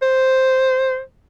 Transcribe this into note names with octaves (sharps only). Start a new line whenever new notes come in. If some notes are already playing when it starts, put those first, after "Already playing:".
C5